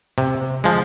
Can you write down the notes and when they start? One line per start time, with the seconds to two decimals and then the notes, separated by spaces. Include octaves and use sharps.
0.18 C3
0.64 F3 G#3